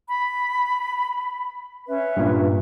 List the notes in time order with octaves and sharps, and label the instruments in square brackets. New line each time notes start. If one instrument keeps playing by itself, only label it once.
[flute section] B5
C#4 B4 E5
[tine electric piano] G2 A#2